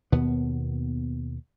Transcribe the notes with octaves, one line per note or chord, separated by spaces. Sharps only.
D#2 B2 B3